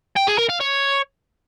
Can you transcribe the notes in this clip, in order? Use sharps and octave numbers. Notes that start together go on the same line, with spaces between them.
G5
G#4
A#4
F5
C#5